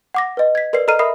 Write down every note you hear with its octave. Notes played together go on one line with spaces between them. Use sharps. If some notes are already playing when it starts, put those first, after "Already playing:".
F#5 D6 A#6
B4 D#5
G#6 B6
A#4 B4 D5 C7
A4 D#5 A#5 F6 C7 D#7
A#4 E5 B5 D#6 C7